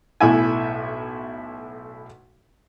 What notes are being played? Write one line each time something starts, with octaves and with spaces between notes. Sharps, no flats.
B1 A2 E4 E5 G#5